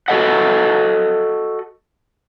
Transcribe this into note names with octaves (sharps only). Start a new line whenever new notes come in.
F#4 A4 D#5 F#5